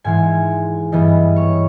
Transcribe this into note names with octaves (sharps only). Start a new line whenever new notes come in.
G#2 E3 G#3 G#5
G2 E3 G3 B3 D#5
C#5